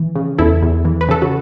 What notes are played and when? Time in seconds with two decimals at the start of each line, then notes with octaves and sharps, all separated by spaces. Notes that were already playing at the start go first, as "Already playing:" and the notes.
Already playing: E3
0.16 C#3
0.38 E2 E4 A4
0.63 E2
0.85 E3
1.01 B4
1.09 C#3 A4
1.22 F#4